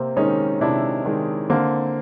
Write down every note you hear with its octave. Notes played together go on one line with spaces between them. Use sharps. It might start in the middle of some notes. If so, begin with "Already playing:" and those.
Already playing: C3 A#3 C4
D#3 G#3 C#4 D#4
C3 D4 E4
D#3 G#3
D3 A#3 C4